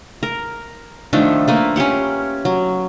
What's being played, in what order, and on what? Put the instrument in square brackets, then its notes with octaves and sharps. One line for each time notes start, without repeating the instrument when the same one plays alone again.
[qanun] A#4
D#3 F3 A3 D4
A3 A#3 B4
C#4 F4 G4 F#5
F#3